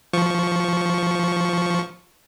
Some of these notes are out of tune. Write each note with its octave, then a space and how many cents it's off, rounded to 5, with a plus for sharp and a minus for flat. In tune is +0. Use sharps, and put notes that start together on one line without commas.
F3 +0 C#6 +0